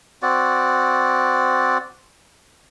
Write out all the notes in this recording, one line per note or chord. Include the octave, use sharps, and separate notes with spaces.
C4 F#4 D5